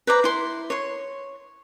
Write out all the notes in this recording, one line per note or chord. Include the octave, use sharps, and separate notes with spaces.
B4 C5 D5 A#5
E4 C6
C#5 C6